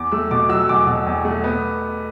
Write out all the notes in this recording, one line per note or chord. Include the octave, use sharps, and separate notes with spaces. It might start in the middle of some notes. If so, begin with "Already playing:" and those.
Already playing: E2 D6
A3 E6
B2 D6
F#3 E6
E2 D6
B2
E2
A3
B3